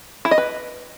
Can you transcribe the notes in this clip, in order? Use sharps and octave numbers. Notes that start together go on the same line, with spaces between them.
E4
D#5
B4